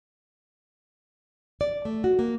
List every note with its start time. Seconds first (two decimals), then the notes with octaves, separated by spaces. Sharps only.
1.61 D5
1.85 A3
2.04 F#4
2.19 A#3